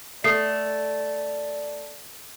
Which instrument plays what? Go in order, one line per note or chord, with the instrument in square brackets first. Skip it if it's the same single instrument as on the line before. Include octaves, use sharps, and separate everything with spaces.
[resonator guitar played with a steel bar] A3 [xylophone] A4 D#6 C7 [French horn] D5